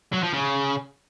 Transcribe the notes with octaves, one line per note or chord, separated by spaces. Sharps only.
F#3
F3
C#3